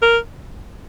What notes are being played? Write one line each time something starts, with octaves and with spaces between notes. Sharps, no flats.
A#4